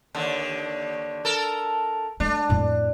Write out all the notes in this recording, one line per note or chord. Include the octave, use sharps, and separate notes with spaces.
D#2 D3
A4 A#4
A3 D4
F2 A2